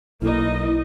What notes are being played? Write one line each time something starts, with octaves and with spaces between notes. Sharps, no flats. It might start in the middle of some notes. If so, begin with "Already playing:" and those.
B1 A#3 D#4 E4 D#5